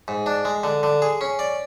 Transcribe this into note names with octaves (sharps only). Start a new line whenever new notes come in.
G#2
D4
G#3
D3
D3
G#4
C#4
D5